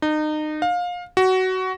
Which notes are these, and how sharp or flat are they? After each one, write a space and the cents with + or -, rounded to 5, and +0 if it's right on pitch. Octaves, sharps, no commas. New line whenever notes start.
D#4 -30
F5 +25
F#4 +15